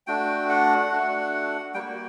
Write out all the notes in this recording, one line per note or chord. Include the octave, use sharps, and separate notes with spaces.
A3 D4 F#4 G5
F#5
A3 D4 F#4
G3 A#3 F#4 G5